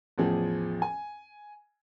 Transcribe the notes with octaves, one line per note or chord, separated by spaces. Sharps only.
A1 E2 F3 G#4
G#5